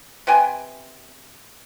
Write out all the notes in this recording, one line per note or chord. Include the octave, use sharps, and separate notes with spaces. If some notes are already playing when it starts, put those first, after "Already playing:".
C3 B4 G5 G#5